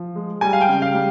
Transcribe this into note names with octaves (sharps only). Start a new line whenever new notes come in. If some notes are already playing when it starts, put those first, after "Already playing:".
Already playing: F3
G#3
G3 G#5
F5
G5
C#3
F5
G3